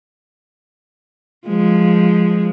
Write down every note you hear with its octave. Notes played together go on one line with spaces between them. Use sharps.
F3 G#3